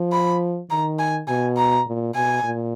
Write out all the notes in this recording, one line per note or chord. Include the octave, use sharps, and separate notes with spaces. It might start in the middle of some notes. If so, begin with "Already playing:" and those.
Already playing: F3
B5
D#3 A#5
G#5
B2 G#5
A#5
A#2
B2 G#5
A#2